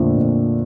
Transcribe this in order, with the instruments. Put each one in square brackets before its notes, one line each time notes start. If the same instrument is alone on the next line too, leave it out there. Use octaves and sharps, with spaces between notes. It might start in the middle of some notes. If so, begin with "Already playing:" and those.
Already playing: [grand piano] F2 D3 F3 A3 D4 [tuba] A#2
[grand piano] F2